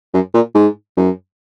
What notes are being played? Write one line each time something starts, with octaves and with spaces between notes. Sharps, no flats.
F#2
A#2
G#2
F#2